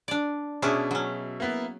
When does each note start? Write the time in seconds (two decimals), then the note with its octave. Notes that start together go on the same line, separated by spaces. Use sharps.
0.08 D4 D5
0.62 B2 C#4 D4 G#4 E5 C#6
0.91 F#3 C#4
1.40 A#3 B3 E4